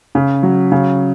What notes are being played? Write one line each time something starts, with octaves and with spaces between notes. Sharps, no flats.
C#3
F#3
C#3